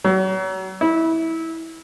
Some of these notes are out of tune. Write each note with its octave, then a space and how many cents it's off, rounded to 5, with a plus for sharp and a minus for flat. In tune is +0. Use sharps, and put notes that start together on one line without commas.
F#3 +35
E4 -20